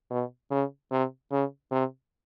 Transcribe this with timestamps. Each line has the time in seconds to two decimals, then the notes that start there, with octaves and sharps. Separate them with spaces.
0.10 B2
0.51 C#3
0.92 C3
1.32 C#3
1.72 C3